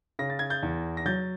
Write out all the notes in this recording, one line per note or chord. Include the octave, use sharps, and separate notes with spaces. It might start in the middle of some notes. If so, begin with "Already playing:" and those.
C#3 A#6
A6
G#6
G6 A6
E2
A#6
F#3 G6 A6